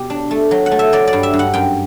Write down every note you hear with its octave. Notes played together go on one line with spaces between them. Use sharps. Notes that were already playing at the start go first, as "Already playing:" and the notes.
Already playing: B2 G4
D4
A3
F#3
F#5
A3
E5
F#3 D5
D5
G2
E5
G2
F#5
F#2 G5